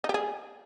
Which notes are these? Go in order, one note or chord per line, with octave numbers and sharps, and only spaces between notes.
D#4
G4
G#4